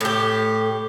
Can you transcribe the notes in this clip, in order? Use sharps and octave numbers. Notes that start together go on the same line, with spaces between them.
A2 G4